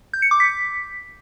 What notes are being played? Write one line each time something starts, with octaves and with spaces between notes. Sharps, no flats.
G6
C#7
D6
B6